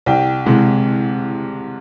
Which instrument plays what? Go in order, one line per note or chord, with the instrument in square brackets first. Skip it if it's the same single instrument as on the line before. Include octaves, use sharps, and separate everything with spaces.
[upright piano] C2 G5
C3 E3 G#3